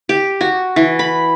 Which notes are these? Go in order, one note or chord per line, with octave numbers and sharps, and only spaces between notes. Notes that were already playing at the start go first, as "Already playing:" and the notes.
G4
F#4
E3
B5